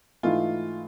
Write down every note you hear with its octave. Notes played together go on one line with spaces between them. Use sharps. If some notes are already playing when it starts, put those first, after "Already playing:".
G#2 E3 A3 F4